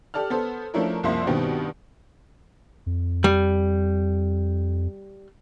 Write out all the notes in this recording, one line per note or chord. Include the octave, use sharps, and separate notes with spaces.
G4 A4 D5 A5 F6
B3 A4 C5 A5
F3 A3 C#4 D4 E4 A#4
F#1 C2 F3 A#3 E5 C6
G2 B2 D#3 B3 C4 G4
F2
G3